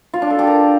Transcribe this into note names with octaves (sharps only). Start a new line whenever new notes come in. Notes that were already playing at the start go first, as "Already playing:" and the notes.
F4
D4
A4
G4
A#4